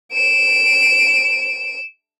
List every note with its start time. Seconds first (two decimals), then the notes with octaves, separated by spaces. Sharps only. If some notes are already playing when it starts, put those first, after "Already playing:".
0.13 D7 E7